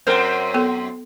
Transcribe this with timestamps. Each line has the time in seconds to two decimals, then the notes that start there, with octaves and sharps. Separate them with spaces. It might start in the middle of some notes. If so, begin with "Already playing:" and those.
0.07 F#2 C4 A#4 C5
0.54 B3 A4